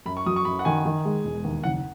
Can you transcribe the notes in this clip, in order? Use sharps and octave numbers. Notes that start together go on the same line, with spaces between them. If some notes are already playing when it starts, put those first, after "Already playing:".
F#2 B5
C#6
F#3 D#6
C#6
F#2 B5
F#5
D#3 G#5
D#3
G#3
E1
D#2
F#1 F#5